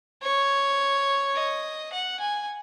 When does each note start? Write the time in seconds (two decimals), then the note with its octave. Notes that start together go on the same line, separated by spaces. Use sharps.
0.23 C#5
1.36 D#5
1.93 F#5
2.20 G#5